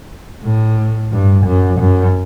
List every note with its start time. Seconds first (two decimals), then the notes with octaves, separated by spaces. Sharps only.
0.44 A2
1.12 G2
1.46 F#2
1.80 F#2